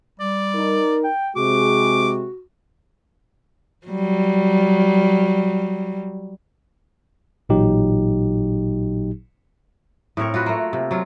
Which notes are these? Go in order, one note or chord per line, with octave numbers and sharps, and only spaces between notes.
G3 D5
D#4 A#4
G5
C3 G#3 F#4 G#4 D6
F#3 G3
A1 A#2 F#3 D#4 G4
A2 C4 A#4 C#5
F4 F#4 B4
A3 A#3
C3
F#3 F4